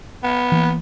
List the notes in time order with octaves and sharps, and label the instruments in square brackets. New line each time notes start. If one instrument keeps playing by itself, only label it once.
[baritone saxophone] B3
[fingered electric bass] E3 A#3